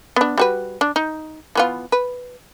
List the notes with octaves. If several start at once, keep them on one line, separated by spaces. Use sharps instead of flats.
B3 D4
G3 F#4 B4
D4
D#4
E3 B3 F4
B4